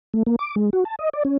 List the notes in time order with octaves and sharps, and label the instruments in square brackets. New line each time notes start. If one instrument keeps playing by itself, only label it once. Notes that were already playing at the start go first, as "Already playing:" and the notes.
[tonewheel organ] A3
A#3
D6
G#3
F#4
A5
D#5
D5
C#4